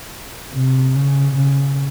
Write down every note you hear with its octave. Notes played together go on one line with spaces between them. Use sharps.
C3
C#3
C#3